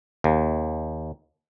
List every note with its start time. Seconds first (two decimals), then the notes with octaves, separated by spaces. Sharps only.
0.24 D#2